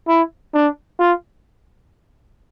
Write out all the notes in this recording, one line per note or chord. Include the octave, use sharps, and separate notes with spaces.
E4
D4
F4